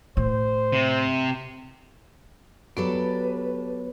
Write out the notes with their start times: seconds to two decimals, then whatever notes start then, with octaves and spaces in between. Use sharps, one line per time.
0.17 A2 C5
0.72 C3
2.77 F#3 B3 G4 A4 B4 C#5 D5